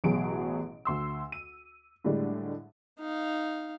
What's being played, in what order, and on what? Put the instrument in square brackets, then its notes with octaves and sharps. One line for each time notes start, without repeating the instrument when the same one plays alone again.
[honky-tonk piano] A1 B2 F#3 G#4 D7
D2 C6 E6
D#7
A2 D3 G3 G#3 D4
[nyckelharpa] D#4 F5